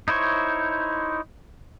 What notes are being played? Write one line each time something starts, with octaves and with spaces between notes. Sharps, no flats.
D#4 E4 C5 C#5